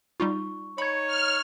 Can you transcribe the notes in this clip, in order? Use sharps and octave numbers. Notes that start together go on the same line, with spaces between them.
G3 D#4 F4 C#6
D#4 C#5 B5 G#6 C#7
F6